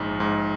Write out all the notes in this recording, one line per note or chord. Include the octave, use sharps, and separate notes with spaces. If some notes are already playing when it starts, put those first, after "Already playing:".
Already playing: A#1 G#2
G#2